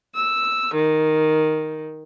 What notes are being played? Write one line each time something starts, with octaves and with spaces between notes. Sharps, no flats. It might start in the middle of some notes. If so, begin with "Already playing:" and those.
E6
D#3